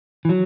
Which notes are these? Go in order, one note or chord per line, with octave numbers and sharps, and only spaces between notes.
E3
F#3